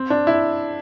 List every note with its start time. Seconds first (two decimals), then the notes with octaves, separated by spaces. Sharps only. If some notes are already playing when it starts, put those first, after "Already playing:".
Already playing: C4
0.10 D4
0.27 E4